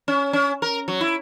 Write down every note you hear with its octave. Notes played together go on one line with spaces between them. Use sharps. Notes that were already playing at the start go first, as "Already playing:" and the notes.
C#4
C#4
A#4
F#3
E4